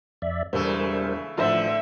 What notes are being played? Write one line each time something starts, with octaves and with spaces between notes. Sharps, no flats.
F2 D5 E5
E1 C#3 E3 G3 A3 A#4 C5 E6
A1 F#2 D3 F3 C5 E5 C6